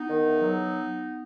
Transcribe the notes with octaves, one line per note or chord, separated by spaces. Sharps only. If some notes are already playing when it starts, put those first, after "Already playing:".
Already playing: B3 D#4
D#3
E2
F#3